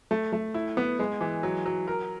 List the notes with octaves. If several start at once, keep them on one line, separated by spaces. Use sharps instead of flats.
A3
A3
E4
B3
G#3
E3
F#3
F#3
A#4